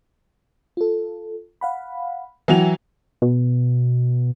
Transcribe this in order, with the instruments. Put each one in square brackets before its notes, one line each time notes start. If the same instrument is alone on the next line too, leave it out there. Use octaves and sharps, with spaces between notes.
[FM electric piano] F4 A4
F5 F#5 B5
[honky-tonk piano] E3 F#3 F7 [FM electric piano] E5 F#5 G5
[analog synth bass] B2